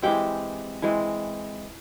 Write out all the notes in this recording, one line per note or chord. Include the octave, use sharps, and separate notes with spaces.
E3 G#3 C4 G4 G5
E3 G#3 C4